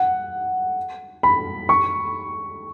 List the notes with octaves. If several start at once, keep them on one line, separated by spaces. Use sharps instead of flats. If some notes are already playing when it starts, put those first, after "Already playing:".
Already playing: F#5
B5
C#6